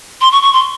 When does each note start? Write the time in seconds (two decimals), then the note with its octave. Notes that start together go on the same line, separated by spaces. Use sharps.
0.21 C6
0.32 C#6
0.42 C#6
0.53 C6